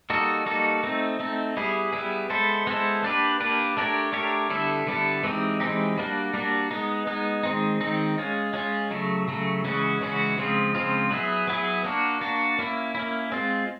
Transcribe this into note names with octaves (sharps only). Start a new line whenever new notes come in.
G3 A#3 D#4 F#4 A4
G3 A#3 D#4 F#4 A4
A3 C4 D#4
A3 C4 D#4
G3 B3 E4 G#4
G3 B3 E4 G#4
G#3 B3 E4 A4 C5
G#3 B3 E4 A4 C5
A#3 D4 G4 B4
A#3 D4 G4 B4
A3 D4 G4 A#4 C#5
A3 D4 G4 A#4 C#5
D3 G3 B3 E4 A4
D3 G3 B3 E4 A4
E3 G#3 C4 D#4 G4
E3 G#3 C4 D#4 G4
G3 A#3 D4 F#4
G3 A#3 D4 F#4
G#3 B3 D#4
G#3 B3 D#4
D#3 G#3 C4 D#4
D#3 G#3 C4 D#4
G#3 C#4 F4
G#3 C#4 F4
C#3 F#3 A3
C#3 F#3 A3
C#3 E3 G#3 C#4 F#4
C#3 E3 G#3 C#4 F#4
C#3 F3 G#3 C4 F4
C#3 F3 G#3 C4 F4
F#3 B3 E4 G#4
F#3 B3 E4 G#4
A#3 D4 F#4
A#3 D4 F#4
A#3 C#4 E4
A#3 C#4 E4
G#3 C4 F4